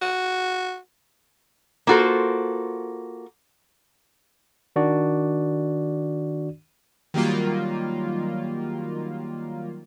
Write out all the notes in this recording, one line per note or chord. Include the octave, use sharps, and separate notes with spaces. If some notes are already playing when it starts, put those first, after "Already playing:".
F#4
A#3 F4 F#4 A4 C5
D#3 D4 F#4 D5
D#3 F#3 G3 A#3 F4